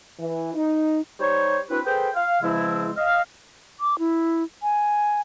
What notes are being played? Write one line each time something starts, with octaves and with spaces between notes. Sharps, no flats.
E3
D#4
G3 D#4 G4 C5 C#5
C4 D4 E4 F#4 B4
G#4 A4 B4 C5 G5
F5
E2 C#3 F3 G#3 C4 E4
D#5 F5
D6
E4
G#5